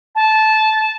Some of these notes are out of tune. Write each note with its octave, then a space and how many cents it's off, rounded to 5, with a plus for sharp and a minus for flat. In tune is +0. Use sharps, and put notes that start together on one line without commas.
A5 -15